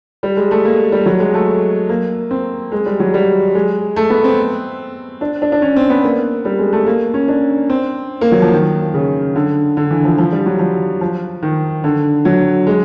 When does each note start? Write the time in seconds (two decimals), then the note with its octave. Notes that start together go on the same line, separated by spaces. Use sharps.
0.23 G3
0.37 G#3
0.51 A3
0.65 A#3
0.92 G3
1.06 F#3
1.20 G#3
1.34 A3
1.89 A#3
2.31 C4
2.72 G#3
2.86 G3
3.00 F#3
3.14 G3
3.55 G#3
3.96 A3
4.10 B3
4.24 C4
5.21 D4
5.42 D4
5.52 D4
5.62 C#4
5.76 C4
5.90 B3
6.04 A#3
6.45 G3
6.59 G#3
6.73 A3
6.86 A#3
7.14 C#4
7.28 D4
7.70 C4
8.21 A#3
8.32 F#3
8.42 F3
8.52 D#3
8.94 C#3
9.35 D3
9.77 D3
9.91 E3
10.04 F3
10.18 F3
10.32 G3
10.46 F#3
10.59 F3
11.01 F3
11.43 D#3
11.84 D3
12.25 F#3
12.67 G#3